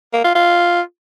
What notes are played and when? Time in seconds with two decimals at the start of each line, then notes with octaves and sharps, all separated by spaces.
0.13 A#3
0.24 F4
0.35 F4